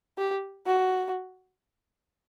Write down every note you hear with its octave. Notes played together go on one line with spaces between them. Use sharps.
G4
F#4